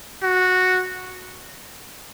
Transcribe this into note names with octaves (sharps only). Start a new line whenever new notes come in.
F#4